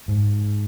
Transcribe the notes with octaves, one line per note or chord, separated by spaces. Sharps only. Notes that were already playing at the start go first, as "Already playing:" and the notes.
G#2